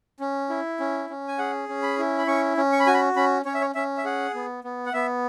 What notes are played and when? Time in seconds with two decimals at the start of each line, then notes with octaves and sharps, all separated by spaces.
0.20 C#4
0.50 E4
0.80 C#4
1.10 C#4
1.28 G#5
1.38 G#4 F#5
1.69 C#4
1.83 B5
1.98 E4
2.18 B5
2.27 C#4 C#6
2.57 C#4
2.72 C#6
2.80 B5
2.87 F#4 G#5
2.94 B5
3.16 C#4 B5
3.45 C#4 C#5
3.54 E5
3.61 C#5
3.75 C#4 E5
3.97 E5
4.05 G#4 F#5
4.34 B3
4.64 B3
4.86 F#5
4.93 B3 E5